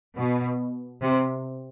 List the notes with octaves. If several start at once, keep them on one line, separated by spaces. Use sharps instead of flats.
B2
C3